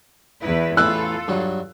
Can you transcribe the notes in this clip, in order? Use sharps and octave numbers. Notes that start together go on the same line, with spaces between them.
E2 E4 B4
A1 E4 F4 A4 B4 E6 F#6
G2 F#3